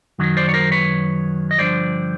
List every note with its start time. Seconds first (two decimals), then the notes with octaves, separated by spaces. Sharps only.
0.19 F#2 D#3 F#3
0.37 C5 D5
0.49 C#5
0.54 A#4 C5
0.72 B4 C#5
1.51 D#5
1.59 G2 D3 F3 C5 D5